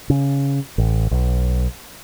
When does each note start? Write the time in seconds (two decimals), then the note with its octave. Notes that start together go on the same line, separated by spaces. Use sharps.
0.10 C#3
0.78 A1
1.11 B1